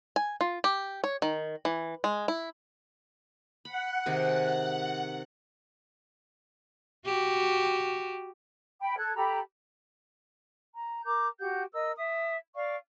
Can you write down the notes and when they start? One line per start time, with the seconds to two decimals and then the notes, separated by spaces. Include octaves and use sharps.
0.16 G#5
0.41 F4
0.64 G4
1.04 C#5
1.22 D#3
1.65 E3
2.04 G#3
2.28 E4
3.65 F#5 B5
4.06 C3 D#3 G#4
7.06 F#4 G4
8.80 G5 B5
8.97 A4 F#6 G#6
9.15 G4 A4 A#5 B5
10.74 A#5
11.05 A#4 A#5 D6 G6
11.40 F#4 G4 F#5 G6
11.73 A#4 D#5 E6
11.97 E5 D#6
12.56 D5 F5 C#6